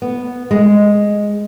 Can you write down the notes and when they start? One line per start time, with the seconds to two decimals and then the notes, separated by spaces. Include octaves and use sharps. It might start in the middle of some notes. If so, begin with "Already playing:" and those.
0.02 B3
0.51 G#3